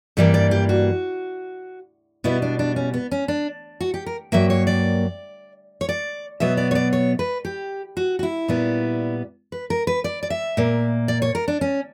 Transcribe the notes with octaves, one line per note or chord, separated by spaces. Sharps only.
G2 E3 G3 A#3
D5
G4
F#4
B2 G3 B3 E4
D4
D4
C#4
B3
C#4
D4
F#4
G4
A#4
G2 F#3 A#3 E5
C#5
D5
C#5
D5
B2 F#3 B3 E5
D5
C#5
D5
C#5
B4
G4
F#4
F#4
E4
A#2 G3 B3
B4
A#4
B4
D5
D5
E5
A#2 A#3
D5
C#5
A#4
D4
C#4